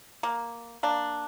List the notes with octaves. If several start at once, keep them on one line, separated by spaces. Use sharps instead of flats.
A#3
A#3 D4